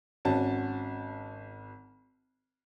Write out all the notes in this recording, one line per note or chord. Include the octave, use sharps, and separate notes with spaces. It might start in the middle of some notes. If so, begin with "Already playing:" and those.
G#1 C#4 F#4 A5